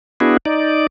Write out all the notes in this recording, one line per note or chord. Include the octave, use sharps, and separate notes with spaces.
B3 D4 E4 F#4 G#4
D#4 D5